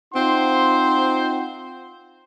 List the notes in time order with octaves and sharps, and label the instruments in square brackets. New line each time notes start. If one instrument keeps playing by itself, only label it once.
[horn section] C4 D#4 F4 C5 F#5 C6